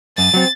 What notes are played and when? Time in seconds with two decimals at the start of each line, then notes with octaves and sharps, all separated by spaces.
0.17 F#2 A6
0.34 F#3 C4